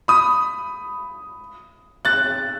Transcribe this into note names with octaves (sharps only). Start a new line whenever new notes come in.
B5 D#6
F#6 A6